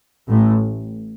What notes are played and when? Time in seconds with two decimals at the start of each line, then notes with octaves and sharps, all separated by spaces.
0.28 A1 A2